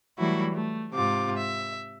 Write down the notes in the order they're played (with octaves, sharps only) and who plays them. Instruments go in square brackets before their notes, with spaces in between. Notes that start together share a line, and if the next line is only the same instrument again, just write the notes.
[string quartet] E3 F#3 G3 A3 E4 F#4
A3
G#2 C3 F4 D6
E5